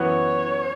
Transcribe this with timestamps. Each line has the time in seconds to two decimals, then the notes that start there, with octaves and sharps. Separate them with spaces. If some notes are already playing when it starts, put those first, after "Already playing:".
Already playing: F#2 E3 B3 F#4 C#5